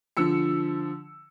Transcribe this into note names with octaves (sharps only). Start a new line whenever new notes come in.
D3 F3 E6 C#7